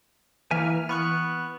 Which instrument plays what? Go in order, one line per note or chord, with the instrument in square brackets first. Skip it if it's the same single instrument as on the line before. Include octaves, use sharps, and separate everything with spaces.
[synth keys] E3 F6 [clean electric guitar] A#3 E5 G#5
[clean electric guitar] B3 [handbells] B5 C#6 F#6